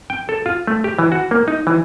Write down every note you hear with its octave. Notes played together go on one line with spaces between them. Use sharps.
G5
A4
F4
A3
G4
E3
F#4
A#3
D#4
E3